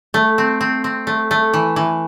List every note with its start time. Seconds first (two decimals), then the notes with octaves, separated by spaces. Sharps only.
0.14 A3
0.38 C4
0.61 C4
0.84 C4
1.07 A3
1.31 A3
1.53 E3
1.76 E3